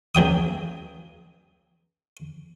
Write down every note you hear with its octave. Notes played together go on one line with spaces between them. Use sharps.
C#2 F#3 G5 D#6